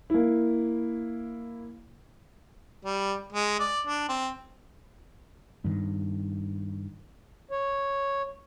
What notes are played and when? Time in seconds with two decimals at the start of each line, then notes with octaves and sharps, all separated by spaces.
0.10 A#3 E4
2.85 G3
3.33 G#3
3.60 D5
3.87 D4
4.09 C4
5.65 G2 D#3
7.51 C#5